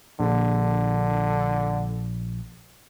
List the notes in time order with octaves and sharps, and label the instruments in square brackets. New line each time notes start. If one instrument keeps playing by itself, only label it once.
[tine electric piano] A#1 [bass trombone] D3